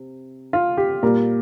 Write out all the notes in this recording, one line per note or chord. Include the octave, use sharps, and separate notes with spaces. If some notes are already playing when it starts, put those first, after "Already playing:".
Already playing: C3
F4
G4
A#2 G3 A#4